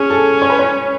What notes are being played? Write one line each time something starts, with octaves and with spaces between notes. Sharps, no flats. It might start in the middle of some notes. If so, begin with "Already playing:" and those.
Already playing: C#4 G#4
A4
C#5
B4
C#5